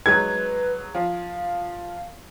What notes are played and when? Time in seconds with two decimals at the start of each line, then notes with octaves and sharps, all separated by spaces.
0.06 F#3 G#3 D#4 B4 G#6
0.95 F3 F5